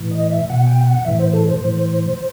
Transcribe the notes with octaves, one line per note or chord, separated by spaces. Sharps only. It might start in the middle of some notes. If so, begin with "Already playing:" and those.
Already playing: A2 E3
D#5
E5
B2 F#5
G5
F#5
A2 E3 E5
C5
A4
C5
A2 E3